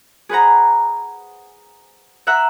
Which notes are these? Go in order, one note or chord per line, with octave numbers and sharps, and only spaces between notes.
G#4 B4 C5 F#5 A#5
E5 F#5 A#5 E6 F#6